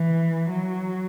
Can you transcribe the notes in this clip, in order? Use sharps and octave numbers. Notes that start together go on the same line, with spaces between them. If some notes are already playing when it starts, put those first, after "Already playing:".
Already playing: E3
F#3